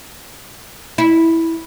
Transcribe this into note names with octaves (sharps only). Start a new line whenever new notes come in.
E4